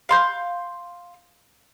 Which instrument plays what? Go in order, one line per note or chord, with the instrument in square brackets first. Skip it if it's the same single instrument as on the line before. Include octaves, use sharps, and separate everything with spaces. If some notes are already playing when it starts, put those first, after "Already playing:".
[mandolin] F5 C6 G6